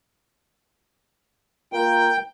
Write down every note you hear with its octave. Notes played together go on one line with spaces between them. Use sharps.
A#3 F4 A#4 G5